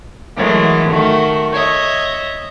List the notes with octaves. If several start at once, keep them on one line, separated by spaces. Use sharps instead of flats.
E3 F#3 G#3 A3 A#4
D#3 A3 F#4 A#4
C#5 D#5 E5